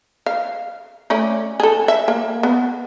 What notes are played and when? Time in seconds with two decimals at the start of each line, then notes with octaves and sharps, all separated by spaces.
0.26 F5
1.10 A3 C#4 D5
1.60 G#4 A4
1.88 E5
2.08 A#3
2.43 B3